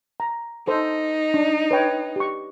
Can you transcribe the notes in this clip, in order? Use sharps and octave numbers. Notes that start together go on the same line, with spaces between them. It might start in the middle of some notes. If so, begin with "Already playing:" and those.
A#5
D#4 A4 C5
D4
B4 C#5 G5
G4 C#6